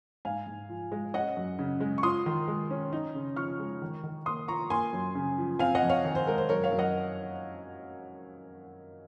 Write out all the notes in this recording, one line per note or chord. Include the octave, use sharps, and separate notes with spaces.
G#2 F5 G#5
G#2
F3
G#3
C#4 D#5 F#5
F#2
C#3
G#3
C#6
F4 C6 D#6
D#3
G#3
C#4
D#4
C#3
F3 C#6 F6
G#3
D#3
D#3
A#3 C6 D#6
F4 A#5 C#6
A#3 G#5 C6
F#2
C#3
F3
C4 F5 G#5
D#5 F#5
F2
C#5 F5
D#3
C5
G#3 A#4
C5
F#2 A#4 C#5
C#5 F5
F#2
D#5 F#5